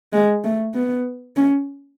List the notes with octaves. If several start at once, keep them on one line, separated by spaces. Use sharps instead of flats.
G#3
A3
B3
C#4